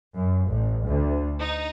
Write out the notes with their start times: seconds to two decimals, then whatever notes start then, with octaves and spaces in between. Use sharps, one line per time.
0.14 F#2
0.48 A1
0.85 D2
1.39 D#4